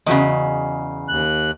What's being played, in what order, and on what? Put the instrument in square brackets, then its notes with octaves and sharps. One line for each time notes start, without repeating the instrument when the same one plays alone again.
[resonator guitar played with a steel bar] E2 C#3 [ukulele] F#4 D#5
[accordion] D#2 F#6